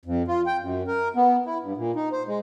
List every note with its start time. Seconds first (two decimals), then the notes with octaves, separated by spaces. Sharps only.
0.05 F2
0.28 F4
0.46 G5
0.61 F#2
0.88 A#4
1.16 B3
1.46 E4
1.62 G2
1.77 A#2
1.96 D#4
2.12 C5
2.27 G#3